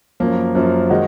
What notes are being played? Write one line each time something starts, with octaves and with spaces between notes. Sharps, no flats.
F#2 F3 A#3
F#2 F3 A#3
D#3 G#3 D#4 F#4